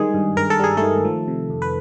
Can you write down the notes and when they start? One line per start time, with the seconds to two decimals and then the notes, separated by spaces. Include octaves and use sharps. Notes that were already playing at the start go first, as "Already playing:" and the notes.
Already playing: D#3 G3 G#3 G#4
0.14 G2
0.37 G2 A#4
0.50 A4
0.59 G3 G#4
0.77 D#3 A3 A4
1.05 F3
1.28 C3
1.50 F2
1.62 B4